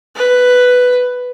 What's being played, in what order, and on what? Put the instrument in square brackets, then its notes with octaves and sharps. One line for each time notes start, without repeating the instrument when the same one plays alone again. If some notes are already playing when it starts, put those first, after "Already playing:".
[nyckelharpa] B4